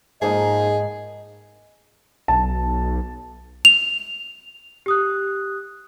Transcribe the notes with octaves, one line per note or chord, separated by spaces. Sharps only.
G#2 F3 A#3 D#4 G#4 D#5
B1 A5
F7
G4 D#6 F#6